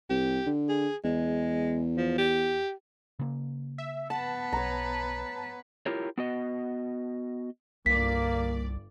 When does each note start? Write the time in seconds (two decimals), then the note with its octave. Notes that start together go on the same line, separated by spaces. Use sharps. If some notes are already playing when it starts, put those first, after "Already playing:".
0.10 C2 G4
0.46 D3
0.69 G#4
1.04 E2 G#3
1.97 F3
2.18 G4
3.19 C#3 A#3
3.78 E5
4.10 B3 B4 F#5 A5
4.53 B1 C#5 A#5
5.86 E4 F4 G4 A#4 C#5
6.18 B3 F#4 D#5
7.86 G1 C2 A#3 D5 B6